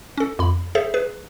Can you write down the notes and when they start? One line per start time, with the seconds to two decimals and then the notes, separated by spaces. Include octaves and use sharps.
0.18 C#4 A4
0.39 F2 B5
0.75 G#4 A4 C5 E5
0.94 G#4 B4